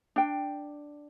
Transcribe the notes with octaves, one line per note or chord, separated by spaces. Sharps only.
D4 G5